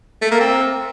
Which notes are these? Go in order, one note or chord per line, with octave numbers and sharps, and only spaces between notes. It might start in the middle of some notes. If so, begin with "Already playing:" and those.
A3
A#3
C4